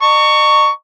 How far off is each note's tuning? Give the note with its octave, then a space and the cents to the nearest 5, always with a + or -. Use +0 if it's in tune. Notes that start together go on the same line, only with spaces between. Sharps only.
D#5 -45 A#5 -35 C#6 +10